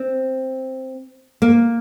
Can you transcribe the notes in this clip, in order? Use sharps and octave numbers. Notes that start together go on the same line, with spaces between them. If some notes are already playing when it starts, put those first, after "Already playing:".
Already playing: C4
A#3